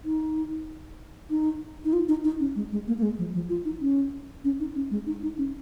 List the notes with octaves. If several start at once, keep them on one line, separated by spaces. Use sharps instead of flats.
D#4
D#4
D#4
F4
D#4
D#4
C#4
G#3
G#3
A#3
A#3
G#3
F3
F3
F4
D#4
C#4
C#4
D#4
C#4
G#3
D#4
D#4
C#4